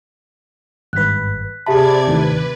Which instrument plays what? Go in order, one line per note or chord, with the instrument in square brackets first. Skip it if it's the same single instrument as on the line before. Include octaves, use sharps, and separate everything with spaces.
[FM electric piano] G#1 G2 B4 [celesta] F#6 B6
[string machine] C3 D5 G#6 [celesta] G4 E5 A5 [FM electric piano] G#4 B5
[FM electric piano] D#2 A2 [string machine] B4